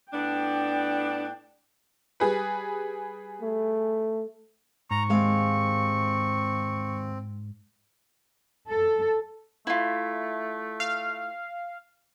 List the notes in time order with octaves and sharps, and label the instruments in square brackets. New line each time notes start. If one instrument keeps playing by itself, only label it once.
[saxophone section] A2 B3 D4 [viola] G5
[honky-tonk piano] G3 G#4 B4
[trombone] A3
[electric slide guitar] G#2 [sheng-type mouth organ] A#5 [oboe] C#6
[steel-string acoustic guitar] D#2 G#3 F5 [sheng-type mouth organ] C4
[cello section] A4
[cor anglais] A3 [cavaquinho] E4 F4
[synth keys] F5